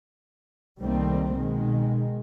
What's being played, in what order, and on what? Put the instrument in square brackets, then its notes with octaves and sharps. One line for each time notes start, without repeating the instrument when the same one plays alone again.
[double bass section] C2 D#3 G3 A3 A#3 C4
B2 D#3 G#3